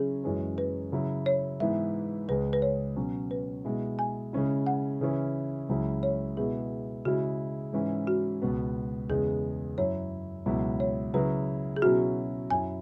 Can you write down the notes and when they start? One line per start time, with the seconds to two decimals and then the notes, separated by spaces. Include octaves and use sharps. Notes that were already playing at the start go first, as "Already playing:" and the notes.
Already playing: C#3 F#3 C#4 E4 G#4
0.24 F#2 E3 G#3 C#4
0.58 B4
0.92 C#3 F#3 E4
1.26 C#5
1.60 G#2 E3 B3 E4 E5
2.28 C#2 C#3 G#3 B4
2.53 B4
2.62 C#5
2.96 B2 F#3 C#4
3.31 B4
3.65 B2 G#3 E4
3.99 G#5
4.33 C#3 G#3 C#4 E4
4.66 F#5
5.01 C#3 E3 C#4 E4
5.69 C#2 C#3 F#3 C#4 E4
6.03 C#5
6.37 B2 G#3 B3 E4 G#4
7.05 C#3 G#3 E4 F#4
7.73 G#2 E3 C#4 E4
8.07 F#4
8.42 C#2 B2 B3
9.09 E2 C#3 G#3 B3 G#4
9.77 F#2 F#3 E4 C#5
10.46 C#2 B2 F#3 E4
10.80 C#5
11.14 C#3 F#3 E4 B4
11.76 G#4
11.82 B2 F#3 C#4 E4 F#4
12.50 F#2 F#3 E4 G#5